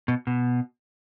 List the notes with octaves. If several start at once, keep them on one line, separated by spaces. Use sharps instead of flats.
B2
B2